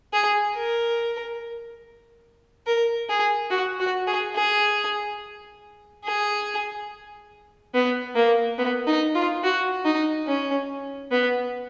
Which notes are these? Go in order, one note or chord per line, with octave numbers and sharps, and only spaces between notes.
G#4
A#4
A#4
G#4
F#4
F#4
G#4
G#4
G#4
B3
A#3
B3
D#4
F4
F#4
D#4
C#4
B3